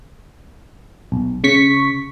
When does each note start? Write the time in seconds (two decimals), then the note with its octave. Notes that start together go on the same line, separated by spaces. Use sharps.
1.12 B1
1.44 C#3 C#6 B6